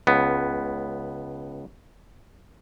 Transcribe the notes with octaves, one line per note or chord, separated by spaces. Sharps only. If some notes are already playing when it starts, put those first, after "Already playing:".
C#2 B3